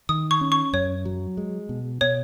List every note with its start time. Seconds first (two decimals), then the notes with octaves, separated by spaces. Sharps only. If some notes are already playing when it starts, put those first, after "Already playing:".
0.09 D#3 D#6
0.31 C#6
0.41 C#4
0.52 C#6
0.73 F#2 C#5
1.05 F#3
1.37 G#3
1.69 B2
2.01 B2 C#5